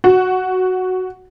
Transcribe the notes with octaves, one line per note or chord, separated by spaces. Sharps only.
F#4